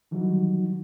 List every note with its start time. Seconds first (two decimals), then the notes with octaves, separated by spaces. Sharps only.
0.11 D#3 E3 F#3 G3 D#4 F#4